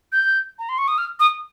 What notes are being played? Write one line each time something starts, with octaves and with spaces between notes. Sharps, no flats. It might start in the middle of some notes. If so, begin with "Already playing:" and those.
G6
A#5
C6
C#6
D#6
F6
D#6